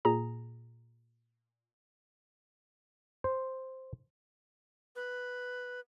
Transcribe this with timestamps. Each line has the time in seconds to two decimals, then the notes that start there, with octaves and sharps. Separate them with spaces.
0.05 A#2 G#4 A#5
3.24 C5
4.96 B4